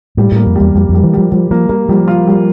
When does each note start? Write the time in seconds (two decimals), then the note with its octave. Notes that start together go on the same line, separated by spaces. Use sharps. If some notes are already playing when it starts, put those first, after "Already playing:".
0.17 A2 G3
0.32 A2 A#3
0.46 F2
0.56 E2 G3
0.75 F2 G3
0.89 F2
0.94 G3
1.04 E3
1.13 F3 G3
1.32 F3 G3
1.51 F3 A#3
1.69 G3 A#3
1.89 F3 G3
2.08 F4
2.27 G3